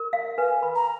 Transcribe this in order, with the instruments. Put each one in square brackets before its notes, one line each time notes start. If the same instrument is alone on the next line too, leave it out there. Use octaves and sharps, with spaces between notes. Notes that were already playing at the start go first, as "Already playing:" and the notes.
Already playing: [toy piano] A#4
F5
[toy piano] B4 [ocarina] G#5
[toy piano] B5
[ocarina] A#5